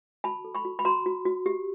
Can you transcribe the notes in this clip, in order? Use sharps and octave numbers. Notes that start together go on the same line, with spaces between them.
F#4 A5 B5
A4
B5 C#6
F#4
B5
F#4 A#5 C6
F#4
F#4
G4